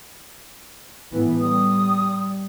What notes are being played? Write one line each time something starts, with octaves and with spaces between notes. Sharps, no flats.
A2 E3 B3
G3 D#6